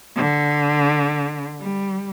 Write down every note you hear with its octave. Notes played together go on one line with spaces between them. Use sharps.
D3
G3